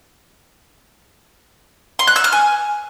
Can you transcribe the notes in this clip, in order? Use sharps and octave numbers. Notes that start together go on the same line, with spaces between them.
C6
F#6
E6
F6
G#5